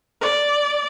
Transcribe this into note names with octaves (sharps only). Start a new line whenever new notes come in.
D5